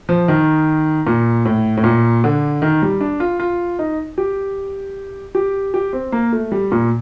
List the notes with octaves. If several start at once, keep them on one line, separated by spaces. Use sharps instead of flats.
F3
D#3
A#2
A2
A2
A#2
D3
D#3
G3
D4
F4
F4
D#4
G4
G4
G4
C4
A#3
A3
G3
A#2